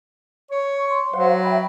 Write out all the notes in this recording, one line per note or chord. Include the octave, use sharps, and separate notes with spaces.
C#5 C#6
C6
F#3 C5 F5 F#5
E5 G5 B5